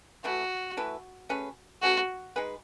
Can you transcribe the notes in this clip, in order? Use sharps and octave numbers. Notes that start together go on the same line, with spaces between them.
E3 A3 E4 F#4 B4
E3 A3 E4 B4
A3 C#4 G#4 B4
A3 C#4 F#4 G#4 B4
G#3 D#4 G#4 B4